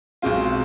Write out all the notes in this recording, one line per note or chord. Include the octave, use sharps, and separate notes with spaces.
B1 B2 G#3 C4 F4